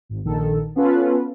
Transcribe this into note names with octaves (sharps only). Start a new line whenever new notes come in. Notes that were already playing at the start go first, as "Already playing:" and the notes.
G#1
A#1 D#3 A4
B3 C#4 F4 A4 B4